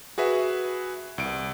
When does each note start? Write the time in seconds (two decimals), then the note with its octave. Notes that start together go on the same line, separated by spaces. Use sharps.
0.18 F#4 G#4 B4 E5
1.18 C2 D7